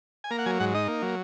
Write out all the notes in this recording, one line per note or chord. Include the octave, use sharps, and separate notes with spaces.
G#5
A#3 A#5
F#5
F#3 G#5
G#2 F#5
D#4 D#5
A#3
F#3